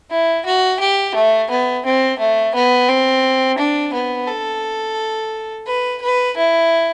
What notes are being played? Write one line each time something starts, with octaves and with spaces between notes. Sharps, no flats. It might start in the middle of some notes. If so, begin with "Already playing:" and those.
E4
F#4
G4
A3
B3
C4
A3
B3
C4
D4
B3
A4
B4
B4
E4